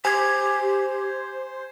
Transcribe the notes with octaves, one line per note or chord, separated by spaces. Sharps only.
G4 C5 G#5 G#6